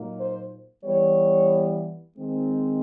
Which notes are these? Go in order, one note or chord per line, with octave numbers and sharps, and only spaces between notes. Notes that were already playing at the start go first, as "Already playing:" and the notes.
Already playing: A#2 F#3 A#3 D#4
C5
E3 G3 B3 C#5
D#3 G#3 C4